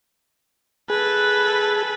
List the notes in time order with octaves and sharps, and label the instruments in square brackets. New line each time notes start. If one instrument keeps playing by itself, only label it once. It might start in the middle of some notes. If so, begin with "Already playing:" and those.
[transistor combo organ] G#4 [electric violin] A4 B4